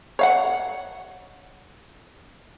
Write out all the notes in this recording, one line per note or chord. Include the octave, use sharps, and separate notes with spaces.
C#5 F5 F#5